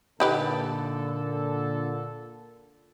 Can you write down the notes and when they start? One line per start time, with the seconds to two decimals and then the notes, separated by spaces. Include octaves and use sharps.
0.20 A#2 D3 D#4 G4 A4 B4